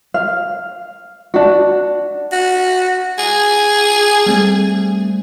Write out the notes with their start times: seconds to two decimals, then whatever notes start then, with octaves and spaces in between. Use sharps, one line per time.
0.14 F5
1.34 D4 F#4
2.32 F#4
3.18 G#4
4.26 G3 A3 C4